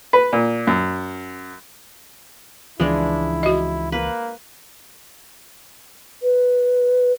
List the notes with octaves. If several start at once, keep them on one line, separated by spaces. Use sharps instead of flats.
B4
A#2
F#2
C#2 E3 F3 G#3 D4 E4 D5
F#4 D#5
A#3 B4
B4